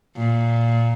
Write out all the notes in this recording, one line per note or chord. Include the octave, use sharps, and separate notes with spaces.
A#2